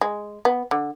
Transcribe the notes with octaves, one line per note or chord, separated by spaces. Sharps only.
G#3
B3
D3